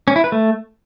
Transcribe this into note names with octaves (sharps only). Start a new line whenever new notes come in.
C#4
E4
B4
A3